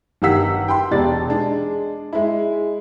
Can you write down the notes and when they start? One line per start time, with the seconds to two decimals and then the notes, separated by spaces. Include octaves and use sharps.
0.22 G1 D#3 G4 F#5 E6 B6
0.68 G5 B5 C6
0.91 E1 B2 G4 D5 A6
1.28 G#3 D4
2.13 G#3 E4